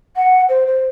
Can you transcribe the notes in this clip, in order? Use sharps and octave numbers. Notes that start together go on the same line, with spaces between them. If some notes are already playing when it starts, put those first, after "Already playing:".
F#5
C5
C5